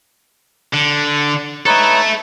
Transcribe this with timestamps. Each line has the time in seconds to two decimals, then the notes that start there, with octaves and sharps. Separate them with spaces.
0.73 D3
1.66 D#4 A4 B4 C#5 E5